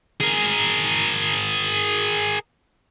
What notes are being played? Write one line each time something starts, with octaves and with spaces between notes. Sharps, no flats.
G#4 A#4